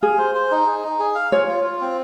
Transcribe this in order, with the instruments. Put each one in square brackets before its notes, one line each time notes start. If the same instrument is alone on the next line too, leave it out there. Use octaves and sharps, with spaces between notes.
[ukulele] G#4 [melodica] F5
[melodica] C5
C5
D#4
G#4
D#4
G#4
F5
[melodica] F4 [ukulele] C#5
[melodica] F4
F4
C4